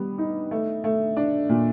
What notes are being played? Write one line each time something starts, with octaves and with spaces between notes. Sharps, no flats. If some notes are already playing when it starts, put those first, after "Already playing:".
Already playing: G3 B3
D#4
A3
A3
D4
A#2